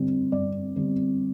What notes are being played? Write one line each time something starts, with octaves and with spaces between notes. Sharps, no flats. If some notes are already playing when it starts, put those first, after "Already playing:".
Already playing: D3 G3 C4
G2 D5
D3 G3 C4